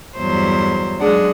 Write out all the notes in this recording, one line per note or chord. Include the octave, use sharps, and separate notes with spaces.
E2 G2 F#3 C5
F#2 G#3 D4 F#5